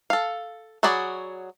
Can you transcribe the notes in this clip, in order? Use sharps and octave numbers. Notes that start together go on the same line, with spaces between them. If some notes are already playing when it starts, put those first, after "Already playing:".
A4 F5
F#3 F#4 G#4 D5 B5